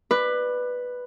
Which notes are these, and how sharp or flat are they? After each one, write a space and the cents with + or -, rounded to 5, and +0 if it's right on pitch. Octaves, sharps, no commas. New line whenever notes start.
B4 +0 D5 +30